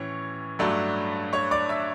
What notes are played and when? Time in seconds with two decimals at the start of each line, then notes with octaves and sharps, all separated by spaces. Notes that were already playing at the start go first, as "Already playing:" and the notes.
Already playing: A2 E3 C#4 C#5 C#6
0.59 G2 F#3 A3 D4
1.33 C#5 C#6
1.51 D5 D6
1.69 E5 E6